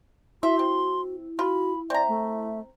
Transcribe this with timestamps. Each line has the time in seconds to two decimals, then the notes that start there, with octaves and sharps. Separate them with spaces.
0.43 E4 F#4 E5 C6
0.59 C4
1.39 F4 F#4 B5
1.90 C4 D5 E5 A#5
2.08 A3